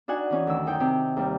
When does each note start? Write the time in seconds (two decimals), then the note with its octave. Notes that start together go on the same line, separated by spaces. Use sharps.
0.08 D4 D#4 F#4 F#5 G#5
0.30 E3 C#4 D#4
0.47 D2 D#3 E6
0.66 F#2 D#4 G5
0.80 C3
1.17 D#2 G3